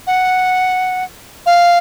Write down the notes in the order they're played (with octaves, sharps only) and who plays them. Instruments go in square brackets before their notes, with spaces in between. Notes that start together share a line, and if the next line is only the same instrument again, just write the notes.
[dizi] F#5
F5